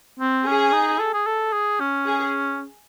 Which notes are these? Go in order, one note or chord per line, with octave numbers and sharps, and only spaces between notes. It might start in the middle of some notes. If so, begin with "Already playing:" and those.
C4
C#4 G#4
D#4
A4
G#4
A4
G#4
C#4
G#4